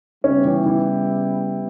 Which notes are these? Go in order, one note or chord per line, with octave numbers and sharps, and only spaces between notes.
C#3 G3 B3 C#4 E4 G4
E3
E3